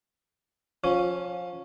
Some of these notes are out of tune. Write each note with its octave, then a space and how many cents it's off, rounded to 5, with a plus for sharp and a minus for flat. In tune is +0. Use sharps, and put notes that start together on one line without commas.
F3 +25 C#4 +0